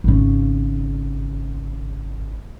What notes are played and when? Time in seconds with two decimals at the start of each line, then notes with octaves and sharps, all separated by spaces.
0.04 G#1 C#3